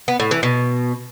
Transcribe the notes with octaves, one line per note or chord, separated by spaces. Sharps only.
B3
A2
E3
B2